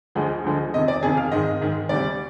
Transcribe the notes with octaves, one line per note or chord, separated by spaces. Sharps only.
D2 D3 F3 G#3
D2 D3 F3 G#3
F2 C3 D#3 D#5
D5
F2 C3 D#3 G#4
F5
G#2 D#3 G#3 D#5
G#2 D#3 G#3
D2 C3 G3 D5